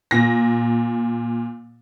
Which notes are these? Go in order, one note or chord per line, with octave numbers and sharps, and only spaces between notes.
A#2 A#6